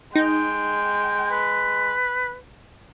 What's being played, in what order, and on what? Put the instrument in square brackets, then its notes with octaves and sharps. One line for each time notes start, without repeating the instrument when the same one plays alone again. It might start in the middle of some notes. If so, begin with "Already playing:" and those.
[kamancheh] G#3 [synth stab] D#4 [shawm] G5
[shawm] B4